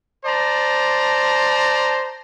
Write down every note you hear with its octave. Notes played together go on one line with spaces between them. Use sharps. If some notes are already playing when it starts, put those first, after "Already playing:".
C5 D5 A5 A#5